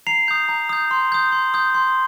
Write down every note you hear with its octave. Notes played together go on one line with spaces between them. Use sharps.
A#5 C7 F7
D#6 G6
A#5
D#6 G6
C6
D#6 G6
C6
D#6 G6
C6